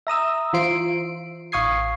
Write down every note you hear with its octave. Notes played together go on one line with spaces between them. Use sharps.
E5 A#5 D#6 E6
E3 F4 C5 C7 D7
A1 F5 C#6 D#6 G#6 C7